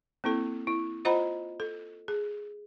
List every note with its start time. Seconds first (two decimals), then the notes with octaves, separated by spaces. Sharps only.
0.24 A#3 C4 E4 A4
0.67 E4
1.05 F4 C5 D#5 F#5 A#5 B5
1.60 A4
2.08 G#4